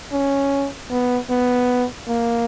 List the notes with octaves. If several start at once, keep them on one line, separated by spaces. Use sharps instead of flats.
C#4
B3
B3
A#3